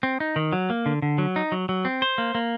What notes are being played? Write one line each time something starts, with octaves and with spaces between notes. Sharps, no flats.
C4
D#4
D#3
F#3
A#3
D3
D3
F#3
D#4
F#3
F#3
C4
C5
A#3
A#3